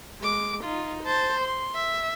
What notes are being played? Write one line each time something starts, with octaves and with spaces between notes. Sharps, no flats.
G#3 D6
D#4 F4
C5 A5
C6
E5